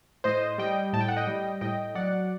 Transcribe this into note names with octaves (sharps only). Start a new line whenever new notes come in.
A2 C5 D#5
G3 D#5 G5
A2 A5
G5
F#5
D#5 G5
G3
A2 D#5 G5
F#3 D5 F#5